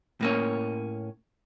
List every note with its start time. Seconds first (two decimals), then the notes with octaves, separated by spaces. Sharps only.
0.21 A2 A#3 C#4